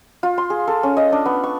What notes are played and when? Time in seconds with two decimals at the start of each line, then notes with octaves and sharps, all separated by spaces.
0.23 F4
0.38 C6
0.50 G#4
0.68 A4
0.83 C#4
0.97 D#5
1.12 D4
1.26 B3
1.43 C#6